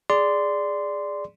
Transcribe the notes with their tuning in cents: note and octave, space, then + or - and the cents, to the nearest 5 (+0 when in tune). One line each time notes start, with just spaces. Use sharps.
G#4 +0 D5 +0 C6 -15